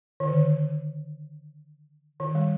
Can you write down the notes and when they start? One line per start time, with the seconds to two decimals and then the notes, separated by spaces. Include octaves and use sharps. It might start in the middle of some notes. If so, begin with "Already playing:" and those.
0.20 D#3
0.25 D3
2.20 D#3
2.35 G3